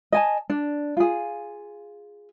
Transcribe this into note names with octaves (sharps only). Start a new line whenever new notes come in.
D#5 G#5 A5
D4
F4 G#4